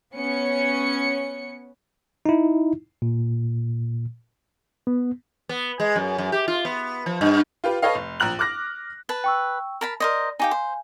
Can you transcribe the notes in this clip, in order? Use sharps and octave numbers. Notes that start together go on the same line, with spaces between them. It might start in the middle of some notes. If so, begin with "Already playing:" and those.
B3 C#4 C#7
D#4 E4
A#2
B3
B3
G#3
F#2
F#2
G4
F4
B3
F3
G2
F4 G4 B4
A4 B4 C#5 D#5 F5
F1
A#1 A#5 F#6 F#7
D6 F6 F#6 A#6
B4 A5
G5 C#6 E6
A#4 A5 B5
A#4 C5 D5 D#5
D#4 G4 F5 G5 G#5
C5